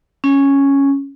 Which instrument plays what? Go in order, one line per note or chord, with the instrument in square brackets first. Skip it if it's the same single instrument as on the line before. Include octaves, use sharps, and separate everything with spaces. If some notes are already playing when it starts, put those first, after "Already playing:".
[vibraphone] C#4